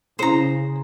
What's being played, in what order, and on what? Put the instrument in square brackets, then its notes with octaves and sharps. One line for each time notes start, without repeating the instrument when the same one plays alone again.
[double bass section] C#3 [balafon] C#4 E4 G#4 [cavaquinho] C5 A#5